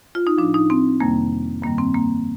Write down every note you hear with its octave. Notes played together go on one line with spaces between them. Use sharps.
F4
D#4
A2 F3 D4
D#4
C4
F2 C3 D#3 G3 A#3
G2 D#3 G3 A#3
C4
A#3